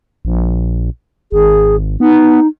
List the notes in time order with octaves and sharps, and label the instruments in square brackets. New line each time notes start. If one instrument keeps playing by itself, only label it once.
[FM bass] A#1
[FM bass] G#1 [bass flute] G#4
[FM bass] B3 [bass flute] D#4